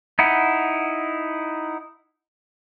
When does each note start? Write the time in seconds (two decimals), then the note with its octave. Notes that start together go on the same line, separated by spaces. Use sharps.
0.19 D#4 E4 F#5